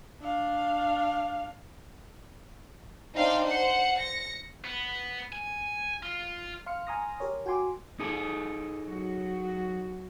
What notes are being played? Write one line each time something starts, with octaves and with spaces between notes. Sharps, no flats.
D4 F5
C4 D4 D#4 F5 G5 C6
C5 F#5 C#7
A#6 C#7
B3
G#5
F4
F5 C6 F6 C#7
G#5 A#5 C6 D#6 F6 A#6
G4 A#4 C#5
F#4 G5 G#5 C6 D6
D#4 G#4 A4
F#3 F#4